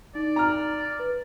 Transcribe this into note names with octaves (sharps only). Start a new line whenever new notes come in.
D#4 D5
A#5 F6
B4